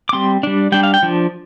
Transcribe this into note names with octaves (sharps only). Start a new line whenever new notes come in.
D6
G3 C4 C6
G3 D4
G3 D4 G5
F5
G5
F3 D4